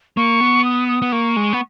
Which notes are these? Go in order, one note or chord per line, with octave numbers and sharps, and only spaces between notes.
A#3 C#6
B3
D#6
D#6
B3
A#3 C#6
G#3
B3